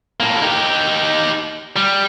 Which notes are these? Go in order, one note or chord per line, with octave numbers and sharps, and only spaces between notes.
A2 A#3
D#4 G4
G3